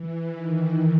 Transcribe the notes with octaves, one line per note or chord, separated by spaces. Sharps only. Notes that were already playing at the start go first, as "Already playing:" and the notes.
Already playing: E3
D#3